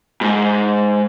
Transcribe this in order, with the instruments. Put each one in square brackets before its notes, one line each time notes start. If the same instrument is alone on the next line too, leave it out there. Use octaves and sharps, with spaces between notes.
[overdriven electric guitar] G#2